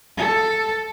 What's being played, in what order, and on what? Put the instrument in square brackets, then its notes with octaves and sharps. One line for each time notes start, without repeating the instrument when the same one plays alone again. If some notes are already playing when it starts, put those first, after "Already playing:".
[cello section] A4